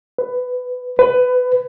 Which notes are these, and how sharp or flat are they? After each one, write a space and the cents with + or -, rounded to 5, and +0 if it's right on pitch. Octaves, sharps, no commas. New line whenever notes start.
B4 +15
B4 +20